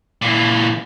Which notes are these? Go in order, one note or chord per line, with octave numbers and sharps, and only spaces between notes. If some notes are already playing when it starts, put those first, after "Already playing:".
A#2 E3